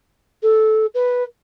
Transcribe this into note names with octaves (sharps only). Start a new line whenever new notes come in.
A4
B4